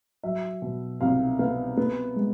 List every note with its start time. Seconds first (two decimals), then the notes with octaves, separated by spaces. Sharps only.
0.23 F#3 E5
0.62 B2
1.01 C2 F5
1.39 B3 F5
1.77 B3
2.16 G#3